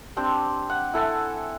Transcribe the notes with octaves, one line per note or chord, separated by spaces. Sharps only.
C4 D4 G4
F#5
E4 A4 F#5 G#5